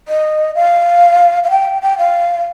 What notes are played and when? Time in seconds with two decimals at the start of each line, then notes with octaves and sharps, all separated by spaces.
0.08 D#5
0.55 F5
1.44 F5
1.51 G5
1.82 G5
1.98 F5